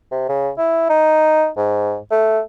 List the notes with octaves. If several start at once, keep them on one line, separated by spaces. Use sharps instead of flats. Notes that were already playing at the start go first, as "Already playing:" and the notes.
C3
C#3
E4
D#4
G#2
A3